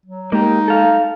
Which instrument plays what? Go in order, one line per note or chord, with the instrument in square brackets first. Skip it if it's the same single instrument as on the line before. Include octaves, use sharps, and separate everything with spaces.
[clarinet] F#3
[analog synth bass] G#3 [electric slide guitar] A#3 G4 [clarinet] D#4
[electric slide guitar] A4 F5